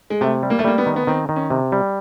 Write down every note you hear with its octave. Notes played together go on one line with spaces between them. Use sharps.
G#3
C3 A3
G3
A#3
A3
G3 A#3
B3
D#3
B3
D#3 C4
D#3
C#4
C3
G3